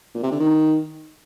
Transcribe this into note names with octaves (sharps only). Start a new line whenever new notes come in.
A#2
C3
D3
D#3